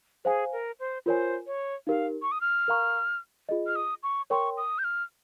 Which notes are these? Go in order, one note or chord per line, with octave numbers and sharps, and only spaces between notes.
G#4 C5 F5 G#5
A#4
C5
F4 A#4 C5 C#5 G#5
C#5
D#4 G4 A#4 F5
C#6
D#6
F6
A#4 F5 A#5 C#6
F4 G#4 D#5
F6
D#6
C#6
A#4 C#5 G5 C6 C#6
D#6
G6
F6